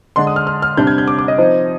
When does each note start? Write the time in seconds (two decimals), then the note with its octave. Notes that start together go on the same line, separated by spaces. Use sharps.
0.16 D3 G#3 D4 C6
0.27 D#6
0.36 F6
0.47 F6
0.62 F6
0.77 C3 G3 D4 G6
0.87 G#6
0.98 G6
1.07 D6
1.18 D6
1.28 D#5
1.38 F3 C4 D#4